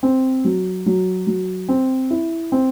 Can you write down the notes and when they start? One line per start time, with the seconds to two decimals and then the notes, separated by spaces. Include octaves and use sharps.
0.03 C4
0.45 F#3
0.86 F#3
1.27 F#3
1.69 C4
2.11 E4
2.52 C4